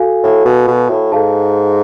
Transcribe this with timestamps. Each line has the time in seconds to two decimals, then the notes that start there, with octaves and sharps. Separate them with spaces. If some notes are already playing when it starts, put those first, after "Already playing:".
Already playing: F#4 A4 F5 G#5
0.23 A2
0.45 B2
0.67 B2
0.90 A2
1.12 G#2 A4 F5 A5